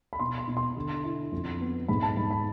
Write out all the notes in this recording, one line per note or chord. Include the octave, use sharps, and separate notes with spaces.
B5
B2 C6
C6
B2
C6
D3
E4
F2
B3
G#2 B5
A5
G#2 B5
B5